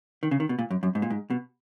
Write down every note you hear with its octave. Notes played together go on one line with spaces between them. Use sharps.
D#3
C#3
D#3
B2
A#2
F#2
F#2
G#2
A#2
G#2
B2